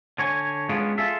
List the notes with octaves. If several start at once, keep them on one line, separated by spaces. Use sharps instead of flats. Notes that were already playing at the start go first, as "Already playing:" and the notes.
D3 C#5 G#5
G#3 B3 C#4 D4 F4 G#4
F4 G#4 A4 E5